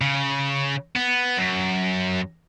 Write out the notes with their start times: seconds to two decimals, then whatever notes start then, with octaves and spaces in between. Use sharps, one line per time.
0.01 C#3
0.95 B3
1.37 F#2